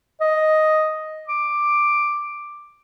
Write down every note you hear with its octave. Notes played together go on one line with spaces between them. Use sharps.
D#5
D6